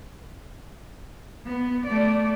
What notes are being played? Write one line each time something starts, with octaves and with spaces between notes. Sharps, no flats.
B3
A3 D5